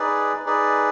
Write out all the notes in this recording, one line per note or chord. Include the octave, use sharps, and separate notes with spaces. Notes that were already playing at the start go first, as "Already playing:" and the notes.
Already playing: D#4 G#4 B4 D5
D#4 G#4 B4 D5